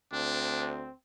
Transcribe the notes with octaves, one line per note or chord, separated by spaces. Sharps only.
D2 C4 D4